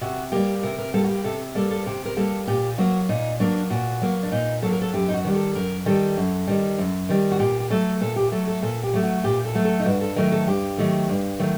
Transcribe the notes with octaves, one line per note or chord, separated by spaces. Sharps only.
C3 F#4
G3 A#3 G4
C3 A#4
A#4
G3 A#3 A4
F#4
G4
C3 A4
G3 A#3 A4
A4
C3 G4
A#4
G3 A#3 A4
A#2 G4
F#3 A#3 F#4
A#2 D#4
F#3 A#3 D4
A#2 F#4
F#3 A#3
D4
A#2 D#4
F#3 A#3 A4
A#4
A4
F#2 G4
D#4
F#4
D#3 G3
A4
F#2 A#4
D#3 G3 A4
F#2
D#3 G3
F#2
D#3 G3
F#4
A#2 G4
G4
F#3 A3 A4
A#2 A4
G4
F#3 A3 A4
A4
A#2 A4
G4
F#3 A3
F#4
A#2 G4
A4
F#3 A3
A4
D#4
G2 F#4
A4
D#3 F#3 A3 A#4
A4
G2 G4
D#3 F#3 A3
G2
D#3 F#3 A3